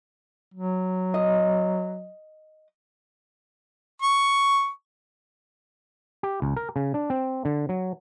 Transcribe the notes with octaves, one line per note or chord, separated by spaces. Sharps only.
F#3
D#5
C#6
G4
C#2
A#4
C#3
D4
C4
D3
F#3